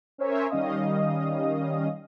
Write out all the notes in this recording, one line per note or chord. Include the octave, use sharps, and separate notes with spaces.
C#4 A#4 C5 C#5 E5 G#5
D#3 G3 C#4 D#5 F5 D#6